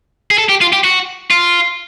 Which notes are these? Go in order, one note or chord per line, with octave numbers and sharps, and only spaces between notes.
G#4
A4
G4
F4
G4
F#4
F4